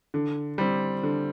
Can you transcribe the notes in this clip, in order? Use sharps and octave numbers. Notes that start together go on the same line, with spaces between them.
D3
G3 C4
D3